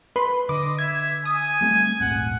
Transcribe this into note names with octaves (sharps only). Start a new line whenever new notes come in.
B4 B5 C6
D3 D#5 D6
E5 G#6
G#5 D#6
G3 A3 C4
D#1 A#1 G#2 F#5